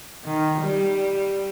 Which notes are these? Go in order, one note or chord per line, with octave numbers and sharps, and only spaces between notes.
D#3
G3